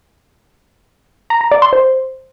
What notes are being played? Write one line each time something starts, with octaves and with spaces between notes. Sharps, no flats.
A#5
A#5
D5
C6
C5